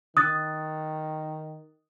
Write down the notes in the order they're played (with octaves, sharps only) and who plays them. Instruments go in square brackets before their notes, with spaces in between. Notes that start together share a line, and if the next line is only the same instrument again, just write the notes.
[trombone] D#3 [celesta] D#6 F#6 A6